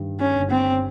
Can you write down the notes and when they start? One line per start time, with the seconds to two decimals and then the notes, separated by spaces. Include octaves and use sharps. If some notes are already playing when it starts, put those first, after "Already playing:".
Already playing: G2 D#3 G3
0.20 C#4
0.35 G1
0.51 C4